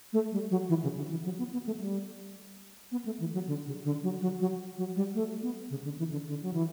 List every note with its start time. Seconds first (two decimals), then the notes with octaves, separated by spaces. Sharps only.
0.13 A3
0.32 G3
0.51 F#3
0.69 E3
0.83 C#3
0.97 D3
1.10 E3
1.25 F#3
1.38 B3
1.53 B3
1.66 A3
1.80 G3
2.92 B3
3.06 A3
3.20 E3
3.34 F#3
3.48 D3
3.66 C#3
3.84 D3
4.03 F#3
4.21 F#3
4.40 F#3
4.78 F#3
4.96 G3
5.14 A3
5.42 B3
5.70 C#3
5.84 D3
5.98 E3
6.12 D3
6.26 D3
6.42 F#3
6.53 E3